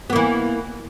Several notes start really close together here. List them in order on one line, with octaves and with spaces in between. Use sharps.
B3 A#3 E3